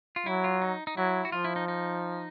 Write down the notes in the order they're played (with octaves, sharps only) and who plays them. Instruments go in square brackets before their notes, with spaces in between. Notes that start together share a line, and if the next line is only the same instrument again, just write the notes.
[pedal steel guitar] F4
[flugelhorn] F#3 [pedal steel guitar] E4
[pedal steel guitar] F4
D#4
D#4
[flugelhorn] F#3 [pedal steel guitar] E4
[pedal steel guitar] F#4
[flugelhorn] F3 [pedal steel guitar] F4
[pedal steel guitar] E4
D#4
D#4